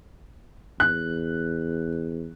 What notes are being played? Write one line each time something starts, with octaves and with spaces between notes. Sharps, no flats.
E2 F#6